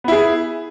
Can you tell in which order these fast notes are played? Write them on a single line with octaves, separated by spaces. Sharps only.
B3 E4 G#4